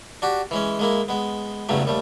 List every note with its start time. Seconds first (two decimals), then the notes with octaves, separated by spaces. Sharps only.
0.22 D4 F#4 G4
0.51 E3 G#3 C#4
0.79 G#3 A#3 E4
1.08 G#3 B3
1.69 E2 G2 C#3 F#3 A3
1.85 D#2 G3 A3